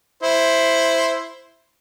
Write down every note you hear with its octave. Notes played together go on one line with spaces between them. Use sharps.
E4 C5